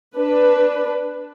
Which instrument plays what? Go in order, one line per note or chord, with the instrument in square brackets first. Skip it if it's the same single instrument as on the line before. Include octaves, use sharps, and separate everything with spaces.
[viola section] D4 B4